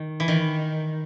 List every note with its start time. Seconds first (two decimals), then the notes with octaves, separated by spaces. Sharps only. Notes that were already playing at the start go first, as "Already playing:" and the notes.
Already playing: D#3
0.20 E3
0.28 D#3